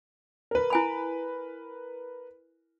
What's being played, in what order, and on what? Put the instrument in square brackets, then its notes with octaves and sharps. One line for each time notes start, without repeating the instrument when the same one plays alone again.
[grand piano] A#4 B4
[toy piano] E4 G#5 B5